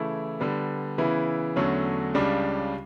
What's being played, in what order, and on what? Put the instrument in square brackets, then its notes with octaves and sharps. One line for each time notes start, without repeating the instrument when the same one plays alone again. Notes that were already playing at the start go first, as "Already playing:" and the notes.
Already playing: [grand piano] C#3 E3 A3 E4
D3 G3 B3
C#3 E3 B3 E4
E2 D3 F#3 A3 C#4
C#2 C#3 G3 D4